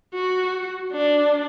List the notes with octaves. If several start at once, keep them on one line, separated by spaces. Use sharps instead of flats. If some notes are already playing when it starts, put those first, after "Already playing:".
F#4
D4